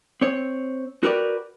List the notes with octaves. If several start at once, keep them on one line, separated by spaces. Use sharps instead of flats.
C4 C#5
F#4 G4 A#4 B4 C#5 D5